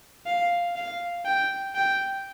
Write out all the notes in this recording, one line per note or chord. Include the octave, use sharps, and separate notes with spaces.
F5
F5
G5
G5